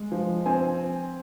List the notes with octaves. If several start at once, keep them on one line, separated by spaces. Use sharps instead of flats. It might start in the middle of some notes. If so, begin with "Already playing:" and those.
Already playing: G#3
F3
C4 G#5